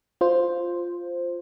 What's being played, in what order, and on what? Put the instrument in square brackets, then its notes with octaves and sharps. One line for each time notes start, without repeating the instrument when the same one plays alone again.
[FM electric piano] F4 C5